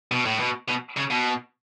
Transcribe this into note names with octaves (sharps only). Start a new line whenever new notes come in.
B2
A2
B2
B2
C#3
B2